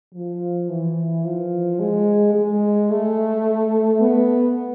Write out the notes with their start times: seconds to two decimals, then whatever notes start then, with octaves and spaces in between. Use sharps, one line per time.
0.14 F3
0.69 E3
1.24 F3
1.80 G#3
2.34 G#3
2.90 A3
4.01 B3